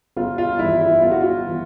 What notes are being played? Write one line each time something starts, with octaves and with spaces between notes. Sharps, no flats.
G1 F4
F4
G2 E3 E4
E4
G1 F4
F#4
F4
E3